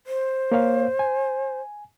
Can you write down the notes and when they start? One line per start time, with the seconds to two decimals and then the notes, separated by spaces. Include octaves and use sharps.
0.07 C5
0.52 A#3 C#5 F5
0.99 G#5